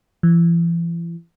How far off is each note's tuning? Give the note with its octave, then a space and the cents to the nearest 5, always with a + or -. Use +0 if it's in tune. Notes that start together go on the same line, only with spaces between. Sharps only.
E3 +40